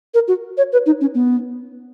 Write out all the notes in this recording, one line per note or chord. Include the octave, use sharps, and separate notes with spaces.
A#4
F#4
C#5
B4
D#4
C#4
B3